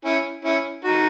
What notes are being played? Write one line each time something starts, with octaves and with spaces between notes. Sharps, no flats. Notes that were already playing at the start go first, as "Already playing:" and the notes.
C#4 E4
C#4 E4
D#4 F#4